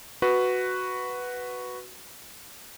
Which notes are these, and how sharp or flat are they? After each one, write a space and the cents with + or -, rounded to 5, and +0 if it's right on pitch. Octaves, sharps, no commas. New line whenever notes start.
F#4 +0 B4 +0